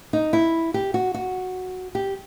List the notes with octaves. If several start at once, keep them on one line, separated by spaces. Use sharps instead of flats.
D#4
E4
G4
F#4
F#4
G4